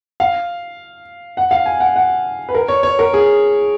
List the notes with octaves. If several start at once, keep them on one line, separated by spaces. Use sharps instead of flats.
F5
F#5
F5
G#5
F#5
F#5
B4
A#4
C#5
C#5
A#4
G#4